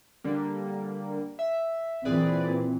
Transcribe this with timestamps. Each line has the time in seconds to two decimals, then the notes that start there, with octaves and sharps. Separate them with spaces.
0.24 D3 G3 A#3
1.39 E5
2.05 A#2 E3 C4 G#4 B4 D5